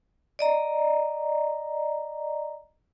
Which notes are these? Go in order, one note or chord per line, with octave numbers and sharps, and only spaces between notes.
D5 D#5 A#5